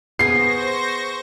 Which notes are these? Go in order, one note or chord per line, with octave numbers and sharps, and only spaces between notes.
B3 G#4 C5 C#6 A#6 C7